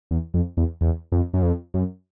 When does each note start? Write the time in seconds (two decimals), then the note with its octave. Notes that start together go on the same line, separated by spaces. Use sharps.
0.11 E2
0.34 F2
0.57 E2
0.81 E2
1.12 F2
1.34 F#2
1.43 F2
1.74 F#2